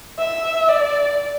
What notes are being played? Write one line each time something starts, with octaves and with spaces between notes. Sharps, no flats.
E5
D5